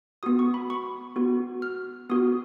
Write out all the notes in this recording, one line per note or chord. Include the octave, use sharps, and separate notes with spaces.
B3 F#4 D#6
C#6
B5
C#6
B3 F#4
F6
B3 F#4 D#6